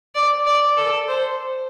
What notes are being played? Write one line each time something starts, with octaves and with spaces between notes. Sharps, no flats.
D5
D5
A4
C5